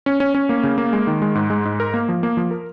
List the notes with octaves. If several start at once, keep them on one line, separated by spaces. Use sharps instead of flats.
C#4
C#4
C#4
A#3
C#3
A#3
G#3
D#3
G#3
G#2
G#3
G#2
A#4
A#3
F3
A#3
F3
A#4